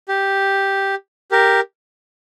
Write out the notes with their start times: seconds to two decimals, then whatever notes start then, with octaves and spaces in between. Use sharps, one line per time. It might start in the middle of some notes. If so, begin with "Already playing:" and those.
0.09 G4
1.31 G4 A#4